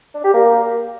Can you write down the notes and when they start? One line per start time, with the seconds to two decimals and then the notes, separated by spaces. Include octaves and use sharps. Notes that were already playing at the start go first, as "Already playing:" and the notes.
0.14 D4
0.24 G4
0.34 A#3